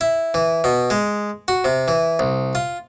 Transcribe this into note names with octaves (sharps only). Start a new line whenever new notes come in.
E4
E3
B2
G#3
F#4
C3
E3
C2
F4